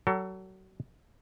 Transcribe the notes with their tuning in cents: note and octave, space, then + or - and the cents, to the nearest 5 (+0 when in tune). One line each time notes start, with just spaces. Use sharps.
F#3 +30 A4 +30